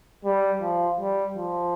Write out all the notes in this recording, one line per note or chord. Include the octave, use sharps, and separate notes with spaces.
G3
F3
G3
F3